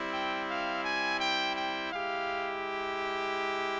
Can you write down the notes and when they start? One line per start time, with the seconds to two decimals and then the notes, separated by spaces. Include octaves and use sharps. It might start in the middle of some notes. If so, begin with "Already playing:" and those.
Already playing: G3 C4 E4
0.13 G5
0.49 F5
0.85 G#5
1.20 G5
1.56 G5
1.92 G#3 E4 G4 F5